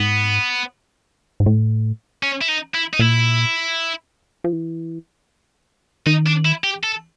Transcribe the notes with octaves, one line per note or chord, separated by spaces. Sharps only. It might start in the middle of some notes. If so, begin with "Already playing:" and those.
Already playing: G#2 B3
G#2
A2
C#4
E4
D#4
E4
D#4
A#2 E4
F3
E3
D#3 D#4
D4
E4
G4
A4